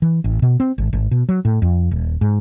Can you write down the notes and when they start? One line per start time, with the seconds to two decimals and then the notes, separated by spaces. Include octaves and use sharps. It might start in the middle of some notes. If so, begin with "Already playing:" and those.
0.02 E3
0.24 A1
0.42 B2
0.60 C4
0.78 G#1
0.93 G#1
1.11 B2
1.29 F#3
1.45 A2
1.62 F2
1.91 D#1
2.21 G#2